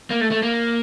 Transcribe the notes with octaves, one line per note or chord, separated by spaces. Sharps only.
A#3
A3
A3
A#3